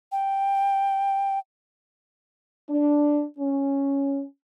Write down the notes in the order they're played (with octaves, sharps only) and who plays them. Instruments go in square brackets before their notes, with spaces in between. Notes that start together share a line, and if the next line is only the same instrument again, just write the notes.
[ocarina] G5
[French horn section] D4
C#4